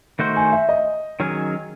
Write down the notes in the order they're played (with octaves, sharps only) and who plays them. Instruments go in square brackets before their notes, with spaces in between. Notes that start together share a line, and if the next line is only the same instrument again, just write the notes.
[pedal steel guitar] D#3 A3 D#4 F#4 C5
[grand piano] G#5
E5
D#5
[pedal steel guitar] D#3 F#3 C#4 G#4